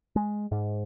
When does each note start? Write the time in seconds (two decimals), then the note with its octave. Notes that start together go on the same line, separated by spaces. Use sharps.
0.16 G#3
0.52 G#2